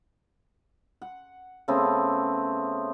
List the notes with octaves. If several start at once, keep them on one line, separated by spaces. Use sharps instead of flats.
F#5
C#3 A3 B3 C4